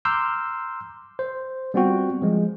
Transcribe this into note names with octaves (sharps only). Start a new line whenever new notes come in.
A#5 C6 D6 E6 F6 G6
C5
G3 B3 C4 F4 F#4 G5
F3 G#3